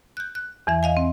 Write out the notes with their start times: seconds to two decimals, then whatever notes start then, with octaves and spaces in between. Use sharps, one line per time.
0.17 F#6 G6
0.35 F#6
0.67 E2 E3 E5
0.83 D#5 F5 G#5
0.97 C4